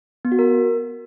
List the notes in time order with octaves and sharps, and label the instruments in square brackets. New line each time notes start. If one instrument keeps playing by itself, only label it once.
[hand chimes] B3
F#4
A#4